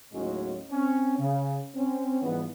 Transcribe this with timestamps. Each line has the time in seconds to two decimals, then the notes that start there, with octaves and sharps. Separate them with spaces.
0.13 D#2 A2 D#3 F#3 G#3 C#4
0.71 C4 C#4
1.18 C#3
1.75 C4 C#4
2.21 G#2 E3 F3 G3 B3